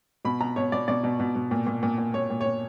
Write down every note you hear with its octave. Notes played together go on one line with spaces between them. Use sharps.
B2 B5
B2 A#5
B2 C#5
B2 D5
B2 D5
B2
B2
B2
A#2
A#2
A#2
A#2
A#2 C#5
A#2
C#5
A#2